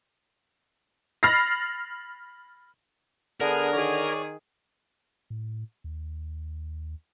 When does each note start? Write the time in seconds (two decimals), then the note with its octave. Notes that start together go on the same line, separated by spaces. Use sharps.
1.23 B5 F6 A6 A#6 C7
3.41 D3 B3 D4 G#4 A#4
3.72 D#3 G#4 C#5 D5
5.30 A2
5.84 D#2